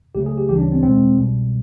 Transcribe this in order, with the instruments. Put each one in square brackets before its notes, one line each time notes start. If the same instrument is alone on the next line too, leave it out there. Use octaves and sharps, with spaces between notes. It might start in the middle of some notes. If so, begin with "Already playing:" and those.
[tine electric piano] C#2 C#3 F#3 A3 G4
G#4
G4
D2 C#3 E3 G3 G4
D4
C#4
C4
E2 B2 G#3 C4
C2 B2 G3